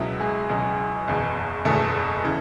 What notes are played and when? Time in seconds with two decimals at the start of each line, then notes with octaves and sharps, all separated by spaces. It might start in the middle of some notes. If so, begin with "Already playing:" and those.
Already playing: C#2 B2 F#3 E4 E5
0.20 G#3 G#4
0.49 C#2 B2 F#3
1.08 F#1 E2 B2
1.65 F#1 E2 B2 A3 A4
2.25 C#3 E3